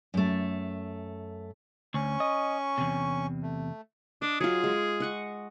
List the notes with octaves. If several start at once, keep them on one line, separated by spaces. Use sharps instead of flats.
F#2 A3
D2 C#4 C#6
D#5
E2 C3
A3
D4 D#5
F#3 F4 G#4
G#3
D#5 F#5 C#6